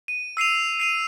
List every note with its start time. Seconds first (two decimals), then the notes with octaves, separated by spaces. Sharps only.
0.08 D#7
0.37 E6 C7 D#7 F7
0.80 C7 D#7 F7